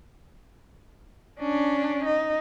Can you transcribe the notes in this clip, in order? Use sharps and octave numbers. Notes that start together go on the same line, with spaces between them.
C#4 D4
D#4